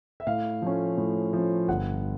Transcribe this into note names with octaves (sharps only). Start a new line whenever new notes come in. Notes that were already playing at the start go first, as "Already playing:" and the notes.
E5
A2 F5
F3 A3 C#4
A2
F3 A3 C#4
G1 F#5